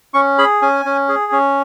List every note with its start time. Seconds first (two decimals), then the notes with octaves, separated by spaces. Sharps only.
0.14 C#4 C#6
0.38 G#4 B5
0.62 C#4 G#5
0.85 C#4
1.08 G#4
1.32 C#4